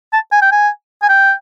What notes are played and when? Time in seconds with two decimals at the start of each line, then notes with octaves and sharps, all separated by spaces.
0.13 A5
0.32 G#5
0.42 G5
0.52 G#5
1.03 G#5
1.09 G5